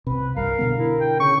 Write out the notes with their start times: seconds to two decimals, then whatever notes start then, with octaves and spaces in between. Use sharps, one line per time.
0.07 C2 C3 B4
0.36 C2 G2 A#4 F5
0.59 B2 D3 B3
0.79 E4 A#4
1.01 G5
1.20 C#3 C#6